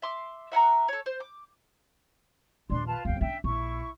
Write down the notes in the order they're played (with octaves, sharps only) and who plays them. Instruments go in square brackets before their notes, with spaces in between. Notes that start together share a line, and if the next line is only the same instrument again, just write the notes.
[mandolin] E5 C6 D6
E5 F#5 G#5 A#5
A4 C#5
C5
D6
[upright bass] A#1 D#2 [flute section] D4 C6
[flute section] F4 B4 A5
[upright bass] G1 D2 [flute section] F5 G5
[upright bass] C#4 D4 [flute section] E5 G5
[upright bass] A#1 [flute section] E4 C#6